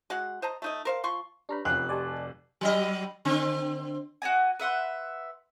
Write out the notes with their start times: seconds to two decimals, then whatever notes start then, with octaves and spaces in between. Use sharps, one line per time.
0.10 G#3 F#4 F#5
0.42 C5 D#5 A5 A#5
0.62 A3 D#4 D#5
0.85 A#4 C5 F5
1.04 F3 C6 C#6
1.49 D4 G4 B4 C#5 A#5 B5
1.65 F1 C#4 F4 G4 F#5 G#5 B5 F#6
1.89 F#4 G4 D5 D#5 G#5 A5
2.61 F#3 G3 D#5
3.25 D3 C4
4.22 F#4 C#5 D#5 G#5
4.60 B4 E5 F#5 C6